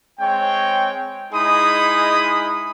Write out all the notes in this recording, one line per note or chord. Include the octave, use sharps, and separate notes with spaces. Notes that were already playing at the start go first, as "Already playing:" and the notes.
G#3 C4 C#5 G5
G#3 D#4 E4 G#4 B5 D#6